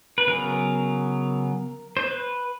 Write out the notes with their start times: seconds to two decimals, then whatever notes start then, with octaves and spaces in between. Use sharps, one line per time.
0.18 B4
0.27 C#3 F#3 B3 A#4
1.97 C5
2.04 B4